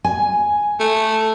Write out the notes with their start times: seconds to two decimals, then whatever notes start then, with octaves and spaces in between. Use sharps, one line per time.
0.04 G#5
0.80 A3 A4